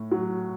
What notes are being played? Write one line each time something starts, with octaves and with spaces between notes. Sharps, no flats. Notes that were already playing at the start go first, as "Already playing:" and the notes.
Already playing: A2
F#3